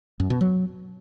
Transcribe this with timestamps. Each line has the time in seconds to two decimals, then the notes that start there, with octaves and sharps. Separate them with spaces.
0.20 F#2
0.30 B2
0.41 F#3